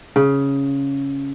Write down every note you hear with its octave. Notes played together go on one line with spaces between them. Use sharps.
C#3